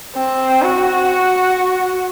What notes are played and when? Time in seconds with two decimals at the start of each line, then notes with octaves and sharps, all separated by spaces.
0.16 C4
0.62 F#4